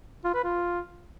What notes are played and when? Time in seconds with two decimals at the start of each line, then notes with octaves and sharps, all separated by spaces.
0.24 F4
0.34 B4
0.44 F4